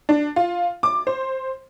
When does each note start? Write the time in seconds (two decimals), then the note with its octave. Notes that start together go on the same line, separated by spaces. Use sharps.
0.09 D4
0.36 F4
0.83 D6
1.07 C5